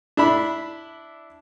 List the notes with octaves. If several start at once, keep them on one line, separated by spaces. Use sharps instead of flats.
D4 E4 B5